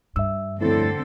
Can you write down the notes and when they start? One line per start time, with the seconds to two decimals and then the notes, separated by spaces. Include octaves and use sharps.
0.16 G2 E5 E6
0.61 D2 A2 D3 F3 A3 C4 A4